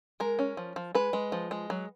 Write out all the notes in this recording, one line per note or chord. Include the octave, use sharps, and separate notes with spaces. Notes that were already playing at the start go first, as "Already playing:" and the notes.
G#3 A#4
C#4
F3
F3
G#3 B4
G#3
F3
G#3
F#3